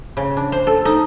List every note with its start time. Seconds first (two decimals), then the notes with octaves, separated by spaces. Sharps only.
0.17 C#3
0.37 D4
0.52 C5
0.67 A4
0.85 D#4